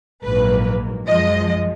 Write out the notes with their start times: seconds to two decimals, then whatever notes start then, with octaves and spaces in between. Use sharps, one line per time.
0.24 A#1 G#2 F#3 A#3 B4
1.07 F#2 F3 G#3 D#5